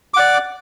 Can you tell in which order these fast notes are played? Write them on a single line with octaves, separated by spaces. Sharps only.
D6 F#5 D5